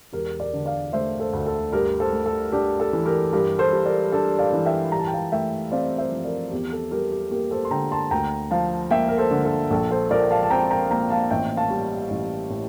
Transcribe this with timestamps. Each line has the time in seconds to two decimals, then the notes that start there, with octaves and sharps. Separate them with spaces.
0.13 E1 G4 A#4
0.40 A#4 D5
0.53 D3
0.66 D5 F5
0.93 A3 C5 E5
1.20 A4 C5
1.33 D2
1.46 A4
1.73 G2 G4 A#4
2.00 A4 C5
2.13 A3
2.26 A4
2.52 D4 G4
2.80 A4
2.93 E3
3.06 G4 A#4
3.33 G2 G4 A#4
3.59 A4 C5
3.73 G3
3.85 A#4 D5
4.12 D4 A4
4.39 D5 F5
4.53 E3
4.65 E5 G5
4.92 G2 A#5
4.99 A5
5.07 G5
5.14 F5 A5
5.32 A3 E5 G5
5.72 C4 D5 F5
5.98 C5 E5
6.12 F3
6.25 A#4 D5
6.51 E2 G4
6.72 A4
6.91 G3 G4 A#4
7.12 G4
7.31 A#3 G4 A#4
7.51 A4 C5
7.65 C6
7.71 D3 G5 A#5
7.92 A5 C6
8.11 D2 G5 A#5
8.51 F3 F5 A5
8.91 A#3 E5 G5
9.08 A#4
9.18 A4 C5
9.31 D3
9.45 A4
9.71 A#1 A4
9.91 A4 C5
10.10 F3 A#4 D5
10.31 F5 A5
10.43 A5
10.50 C4 G5 A#5
10.71 G5 A#5
10.91 A#2 G5 A#5
11.10 F5 A5
11.31 A1 E5 G5
11.57 F5 A5
11.71 G3
12.10 A1
12.50 A2